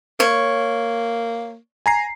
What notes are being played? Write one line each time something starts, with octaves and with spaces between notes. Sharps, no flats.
A#3 C#5
G#5 A#5 C7